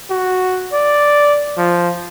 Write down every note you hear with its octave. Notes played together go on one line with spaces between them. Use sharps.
F#4
D5
F3